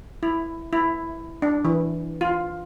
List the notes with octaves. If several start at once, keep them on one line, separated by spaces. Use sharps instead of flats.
E4
E4
D4
E3
F4